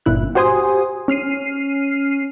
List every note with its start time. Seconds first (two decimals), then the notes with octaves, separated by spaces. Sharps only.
0.06 G1 A#2 E4 F#6
0.35 F#4 G4 C5 G#5 C6 D#6
1.08 C#4 F6 C7 D#7